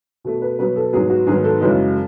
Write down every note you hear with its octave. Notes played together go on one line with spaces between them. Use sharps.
B2 A3
B4
B2 F#3 B3 B4
A4
G#2 F#3 B3 G#4
F#4
G#2 D#3 F#3 B3 G#4
A4
F#2 C#3 E3 G#3